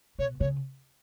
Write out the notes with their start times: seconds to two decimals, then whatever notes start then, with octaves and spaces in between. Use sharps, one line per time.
0.19 B2 C#5
0.40 C#3 C#5